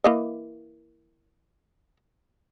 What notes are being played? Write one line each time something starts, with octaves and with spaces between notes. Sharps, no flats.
E3 A#3 D#5